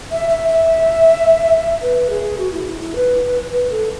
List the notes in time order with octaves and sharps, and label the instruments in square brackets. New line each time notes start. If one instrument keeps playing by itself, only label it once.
[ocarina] E5
E5
E5
B4
G#4
F#4
E4
E4
E4
B4
B4
A4